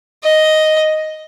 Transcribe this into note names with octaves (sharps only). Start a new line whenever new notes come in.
D#5